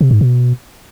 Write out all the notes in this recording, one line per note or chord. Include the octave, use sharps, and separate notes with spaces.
C3
G#2
B2